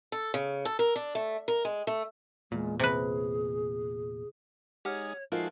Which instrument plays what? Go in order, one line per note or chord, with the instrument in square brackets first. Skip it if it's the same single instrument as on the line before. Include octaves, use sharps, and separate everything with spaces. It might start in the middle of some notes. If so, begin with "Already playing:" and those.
[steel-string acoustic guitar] A4
C#3
A4
A#4
D4
A3
A#4
G#3
A3
[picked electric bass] E2 A#2 [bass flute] G#3
[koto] C3 B4 [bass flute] G#4
[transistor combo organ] G#3 D#4 [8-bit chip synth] G4 F#5 F6 [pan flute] C#5
[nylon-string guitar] F3 D#4 F4 [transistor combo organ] G#3 F#4 A4 [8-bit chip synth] A#4 [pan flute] F5